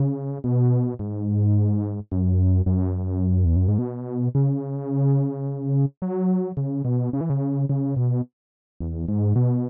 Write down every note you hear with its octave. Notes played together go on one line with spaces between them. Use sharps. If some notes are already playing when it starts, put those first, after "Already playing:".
Already playing: C#3
B2
G#2
F#2
F#2
E2
F#2
G#2
B2
C#3
F#3
C#3
B2
C#3
E3
C#3
C#3
B2
E2
G#2
B2